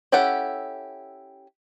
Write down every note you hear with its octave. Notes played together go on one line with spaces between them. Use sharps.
C#4 E4 G4 A4 F#5